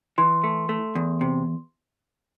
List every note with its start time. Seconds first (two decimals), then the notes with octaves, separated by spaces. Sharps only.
0.18 E3 C6
0.44 A3
0.69 A3
0.95 E2
1.21 C3